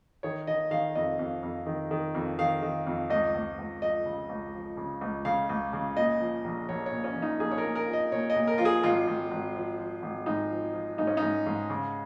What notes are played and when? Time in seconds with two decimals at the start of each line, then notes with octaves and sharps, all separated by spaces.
0.23 D#3 C#5
0.47 D#3 D#5
0.71 D#3 F5
0.95 F2 D#5
1.19 F2
1.43 F2
1.66 D#3
1.91 D#3
2.15 F2
2.39 D#3 F5
2.63 D#3
2.87 F2
3.10 C#2 D#5
3.35 C#2
3.58 C#2
3.82 F3 D#5
4.06 C#3
4.29 C#2
4.54 F3
4.77 C#3
5.01 C#2
5.25 C#3 F5
5.49 C#2
5.73 C#3
5.97 A#2 D#5
6.20 F3
6.44 A#1
6.69 A#1 C#5
6.86 C#5
6.92 A#2
7.04 C#4
7.16 A#1
7.22 D#4
7.40 A#1 G#4
7.51 C#5
7.58 A#4
7.64 A#2
7.75 A#4
7.88 F3
7.93 D#5
8.12 A#2 C#5
8.30 D#5
8.36 A#2
8.48 A#4
8.58 F3 F4
8.65 G#4
8.83 G#1 F4
9.07 G#1
9.31 G#1
9.55 F3
9.79 F3
10.02 G#1
10.26 G#2 D#4
10.51 F3
10.74 F3
10.98 G#2 D#4
11.07 C#4
11.17 G#2 D#4
11.46 G#2
11.70 C#3